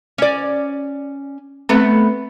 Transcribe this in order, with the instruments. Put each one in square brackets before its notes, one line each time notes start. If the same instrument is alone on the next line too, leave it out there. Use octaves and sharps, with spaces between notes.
[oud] C#4 D5
[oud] A3 B3 [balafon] C4 A4